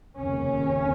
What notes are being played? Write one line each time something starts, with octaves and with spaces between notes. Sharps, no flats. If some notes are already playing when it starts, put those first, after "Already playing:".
F1 D#2 C#3 C#4